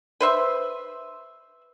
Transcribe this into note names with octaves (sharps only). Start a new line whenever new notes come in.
B4 C5 E5